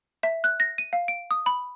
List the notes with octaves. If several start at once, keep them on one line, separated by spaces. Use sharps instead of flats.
E5
F#6
A#6
D#7
F5
D7
D#6
B5